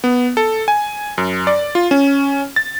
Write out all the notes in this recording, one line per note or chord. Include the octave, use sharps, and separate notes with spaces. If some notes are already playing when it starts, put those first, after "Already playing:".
B3
A4
G#5
F#2
D5
F4
C#4
A6